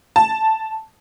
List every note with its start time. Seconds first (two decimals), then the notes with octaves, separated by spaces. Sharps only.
0.16 A5